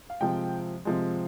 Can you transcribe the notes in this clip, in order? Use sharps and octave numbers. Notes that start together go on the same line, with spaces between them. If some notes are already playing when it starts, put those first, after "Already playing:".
F5
C3 F3 G#3 G5
C3 F3 G#3